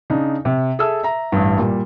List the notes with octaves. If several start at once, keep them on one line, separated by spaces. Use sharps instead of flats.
C#3 D4 D#4
C3
G#4 A4 E5 A5 E6
E5 A#5
A1 G2
A#2 G3